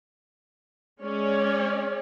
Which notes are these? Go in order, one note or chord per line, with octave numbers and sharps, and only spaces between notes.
G#3 C#4 C#5 D5